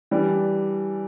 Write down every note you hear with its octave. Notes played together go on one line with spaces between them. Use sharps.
E3 G3 D4